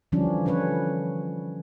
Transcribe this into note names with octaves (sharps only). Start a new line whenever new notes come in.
D3 E3 F3 G3 C#4 D4
D3 C#4 D4 B4 C#5